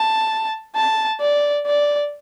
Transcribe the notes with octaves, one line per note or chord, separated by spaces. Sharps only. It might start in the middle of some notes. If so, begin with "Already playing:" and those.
Already playing: A5
A5
D5
D5